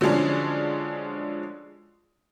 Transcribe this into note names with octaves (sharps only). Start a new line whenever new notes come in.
D3 F3 F#3 G#3 C#4 D4